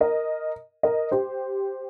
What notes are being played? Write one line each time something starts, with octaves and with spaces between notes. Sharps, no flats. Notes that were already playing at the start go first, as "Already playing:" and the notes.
A#4 D#5
A#4 D#5
G4 C5